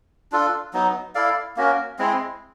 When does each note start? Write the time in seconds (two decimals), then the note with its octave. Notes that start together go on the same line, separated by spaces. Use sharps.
0.32 D4 F4 A4
0.73 F#3 B3 D#4
1.15 E4 A4 D5 F5
1.57 A#3 C#4 F#4 A#4
1.99 G#3 C4 E4